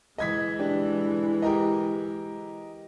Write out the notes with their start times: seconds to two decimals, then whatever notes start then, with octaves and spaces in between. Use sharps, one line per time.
0.18 E3 G#3 D#5 G#6 B6
0.59 D4 G4
1.42 G4 A#4 D#5